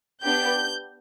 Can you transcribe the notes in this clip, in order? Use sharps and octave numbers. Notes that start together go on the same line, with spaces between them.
B3 D4 G4 G6